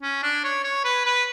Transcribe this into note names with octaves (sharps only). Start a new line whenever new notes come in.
C#4
D4
C#5
C#5
B4
B4